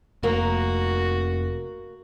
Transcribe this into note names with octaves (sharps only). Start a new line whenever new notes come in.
F1 A#3 F#4 A#4